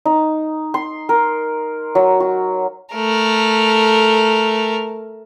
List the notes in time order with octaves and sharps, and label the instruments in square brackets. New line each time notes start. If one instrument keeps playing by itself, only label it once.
[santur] D#4
C6
A#4
F#3
F#4
[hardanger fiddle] A3 A#4